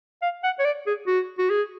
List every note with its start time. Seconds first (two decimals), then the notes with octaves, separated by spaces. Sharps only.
0.22 F5
0.43 F#5
0.59 C#5
0.64 D5
0.87 G#4
1.07 F#4
1.38 F#4
1.50 G#4